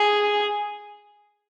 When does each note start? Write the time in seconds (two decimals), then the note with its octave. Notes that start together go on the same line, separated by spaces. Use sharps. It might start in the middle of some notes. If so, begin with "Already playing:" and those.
Already playing: G#4